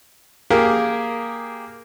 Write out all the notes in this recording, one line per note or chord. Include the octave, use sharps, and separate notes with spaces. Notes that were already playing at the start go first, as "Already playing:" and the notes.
A#3 G4 G#4 A#4